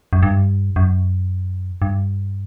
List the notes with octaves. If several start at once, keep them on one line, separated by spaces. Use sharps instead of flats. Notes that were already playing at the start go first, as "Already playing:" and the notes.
F#2
G2
F#2
G2